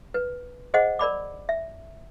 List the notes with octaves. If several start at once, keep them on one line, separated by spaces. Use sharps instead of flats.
B4
G#4 C5 D#5 F#5
A#4 D5 B5 D6
E5